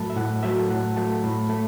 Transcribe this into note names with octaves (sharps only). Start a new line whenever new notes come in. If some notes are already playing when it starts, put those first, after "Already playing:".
Already playing: A2 F#3 A3 A5 B5
E5
A2 F#5
F#3 A3 E5
A5
A2 F#5
F#3 A3 A5
A2 B5
A3 A5